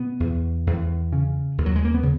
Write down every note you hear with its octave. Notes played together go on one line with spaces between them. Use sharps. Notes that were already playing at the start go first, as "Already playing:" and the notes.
Already playing: B2 B3
E2
E2
C#3
D#2
F#3
G#3
A#3
B3
C#3